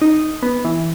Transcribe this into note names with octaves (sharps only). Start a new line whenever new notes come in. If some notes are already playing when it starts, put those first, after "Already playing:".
D#4
B3
E3